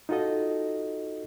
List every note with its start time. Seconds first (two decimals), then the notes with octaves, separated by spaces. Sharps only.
0.09 D#4 F4 F#4 A4 D#5